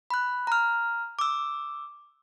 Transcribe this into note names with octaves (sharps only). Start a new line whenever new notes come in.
B5 F#6
A#5 F6
D6 E6